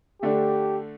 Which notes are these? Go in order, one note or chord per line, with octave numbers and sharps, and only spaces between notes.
D3 A3 D4 G4